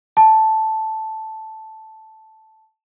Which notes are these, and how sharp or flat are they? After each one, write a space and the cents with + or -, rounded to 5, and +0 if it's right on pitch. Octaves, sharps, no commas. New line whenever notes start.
A5 -5